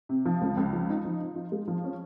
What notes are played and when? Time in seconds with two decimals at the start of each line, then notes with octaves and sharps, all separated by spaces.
0.09 C3
0.25 F3
0.41 C#2
0.57 C#2
0.73 F3
0.89 D#4
1.05 F3
1.21 D#4
1.36 F4
1.52 G#3
1.68 F3
1.84 C#4